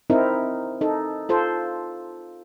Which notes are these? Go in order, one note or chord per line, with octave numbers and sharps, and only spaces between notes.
C4 D#4 E4 A#4
D#4 A4
F4 A4 C5